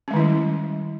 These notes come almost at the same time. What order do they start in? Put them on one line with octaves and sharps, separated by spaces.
C#4 G#3 D#3 E4 G3